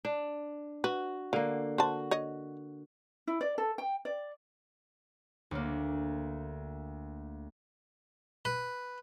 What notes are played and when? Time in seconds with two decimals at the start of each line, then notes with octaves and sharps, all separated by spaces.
0.05 D4
0.84 F#4 B4
1.33 D3 A#3 F5
1.78 F#4 C5 A5
2.11 C#5 D#5
3.27 E4
3.41 D5
3.58 A4
3.78 G5
4.05 D5
5.51 D2 A#3
8.45 B4